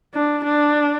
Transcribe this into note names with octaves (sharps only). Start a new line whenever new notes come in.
D4
D4